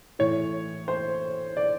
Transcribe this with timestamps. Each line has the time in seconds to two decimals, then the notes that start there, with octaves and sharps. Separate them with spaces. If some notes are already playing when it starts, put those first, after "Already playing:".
0.19 A2 E3 C#5
0.88 C5
1.57 D5